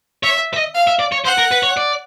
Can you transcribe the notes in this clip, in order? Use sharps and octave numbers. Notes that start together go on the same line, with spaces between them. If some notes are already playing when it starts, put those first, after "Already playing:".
C#5 E5
E5
D#5
F5
E5
D5
C#5
C5 F#5
A#4
B4
C#5
D5